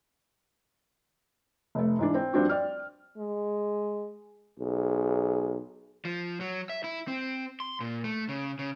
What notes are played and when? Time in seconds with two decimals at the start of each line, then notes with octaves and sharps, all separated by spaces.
1.75 F1 A3
1.99 G#2 E3 D4
2.15 C4
2.33 G2 F3 C4 D4 F#4
2.49 D5 G5 F6
3.17 G#3
4.59 B1 G#4
6.05 F3
6.41 F#3
6.69 E5
6.84 E4
7.08 C4
7.60 C6
7.80 A#2
8.04 A3
8.29 C#3
8.59 C#3